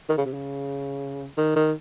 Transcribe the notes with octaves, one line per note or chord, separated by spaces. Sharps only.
D#3
C#3
C3
C#3
D#3
D#3